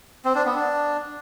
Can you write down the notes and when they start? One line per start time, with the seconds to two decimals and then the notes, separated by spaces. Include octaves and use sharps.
0.25 C4
0.35 D4
0.45 B3
0.55 D4